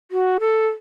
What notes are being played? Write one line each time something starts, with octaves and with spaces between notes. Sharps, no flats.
F#4
A4